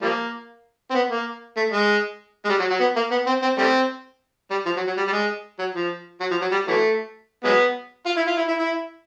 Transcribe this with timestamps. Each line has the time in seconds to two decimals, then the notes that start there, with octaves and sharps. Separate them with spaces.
0.01 F3 G3 A#3
0.90 C4
0.95 B3
1.10 A#3
1.56 A3
1.72 G#3
2.45 G#3
2.49 G3
2.59 F#3
2.70 F#3
2.80 B3
2.96 A#3
3.11 B3
3.27 C4
3.42 C4
3.58 G3 A3 C4
4.50 G3
4.66 F3
4.76 F#3
4.87 F#3
4.97 G3
5.08 G3
5.12 G#3
5.59 F#3
5.74 F3
6.20 F#3
6.31 F3
6.41 F#3
6.52 G3
6.67 E3 F#3 A3
7.44 F#3 G#3 B3
8.06 F4
8.17 E4
8.27 F4
8.37 E4
8.48 E4
8.58 E4